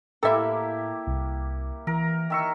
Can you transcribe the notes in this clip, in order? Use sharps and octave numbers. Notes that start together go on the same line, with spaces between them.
A2 A#3 E4 G4 A4 E5 A#5
C2
E3 A#4
D#3 E5 C#6